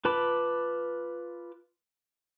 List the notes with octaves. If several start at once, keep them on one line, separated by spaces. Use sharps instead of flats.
F4 B4 A5 B5 D6